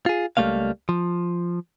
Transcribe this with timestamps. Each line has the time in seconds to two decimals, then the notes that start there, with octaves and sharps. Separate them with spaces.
0.06 F4 G#4
0.37 C#2 A2 G3 A3 A#3 F5
0.89 F3